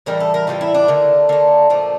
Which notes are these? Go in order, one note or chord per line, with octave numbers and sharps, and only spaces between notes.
A2 E3 G3 A#4
A4
A#4
A2 E3 G3 F4
E4
D4
D3 A3 A#3
D3 A3 A#3
A#2 F3 A3 A#3